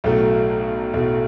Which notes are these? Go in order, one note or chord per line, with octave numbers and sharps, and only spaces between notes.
B1 A2 F#3 A3
B1 A2 F#3 A3